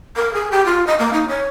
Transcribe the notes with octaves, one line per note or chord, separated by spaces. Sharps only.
A#4
G#4
G4
F4
D#5
A#3
D#4
C#5